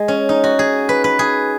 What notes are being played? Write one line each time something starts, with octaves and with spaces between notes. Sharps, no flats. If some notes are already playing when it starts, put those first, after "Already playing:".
Already playing: G#3
C#4
D#4
F#4
G#4
B4
B4
G#4